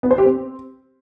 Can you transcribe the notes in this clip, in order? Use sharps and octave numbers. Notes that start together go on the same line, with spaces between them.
B3
C5
G4
C4